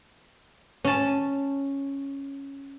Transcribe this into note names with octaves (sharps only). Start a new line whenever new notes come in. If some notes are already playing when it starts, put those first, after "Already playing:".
C#4 A5